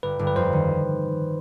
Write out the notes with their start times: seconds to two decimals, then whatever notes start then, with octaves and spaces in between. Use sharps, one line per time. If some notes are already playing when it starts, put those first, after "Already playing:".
0.03 G1 B4
0.19 G1
0.27 B4
0.36 F2 C5
0.53 D#3